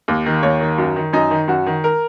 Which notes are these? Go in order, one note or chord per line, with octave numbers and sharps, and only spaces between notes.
D#2
D#3
D#2 C#5
D#3
F#2
D#3
F#2 D#4
D#3
F#2 F#4
D#3
A#4